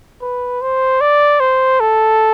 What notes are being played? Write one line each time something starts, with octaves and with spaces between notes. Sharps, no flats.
B4
C5
D5
C5
A4